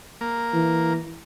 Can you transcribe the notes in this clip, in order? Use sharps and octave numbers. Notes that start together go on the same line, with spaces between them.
A#3
E3